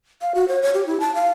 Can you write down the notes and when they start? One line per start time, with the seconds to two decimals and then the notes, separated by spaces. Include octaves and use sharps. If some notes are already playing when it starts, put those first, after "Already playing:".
0.21 F5
0.35 F#4
0.48 C#5
0.62 C#5
0.74 G4
0.86 E4
1.00 A5
1.15 F5